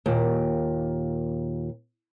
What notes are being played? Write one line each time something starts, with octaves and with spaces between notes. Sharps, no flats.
D#2 A#2